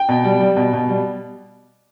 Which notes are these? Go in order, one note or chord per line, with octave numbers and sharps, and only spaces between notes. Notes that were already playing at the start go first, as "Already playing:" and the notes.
Already playing: G5
B2
G3
G3
B2
B2
G3